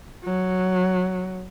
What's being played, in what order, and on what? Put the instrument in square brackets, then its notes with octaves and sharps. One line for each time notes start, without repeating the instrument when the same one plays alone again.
[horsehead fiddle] F#3